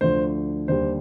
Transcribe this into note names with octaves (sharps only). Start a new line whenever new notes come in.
D2 D3 F3 C5
D#2 D3 G3 C5